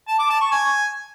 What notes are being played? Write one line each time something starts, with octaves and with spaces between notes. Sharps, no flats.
A5
D6
A5
C#6
G#5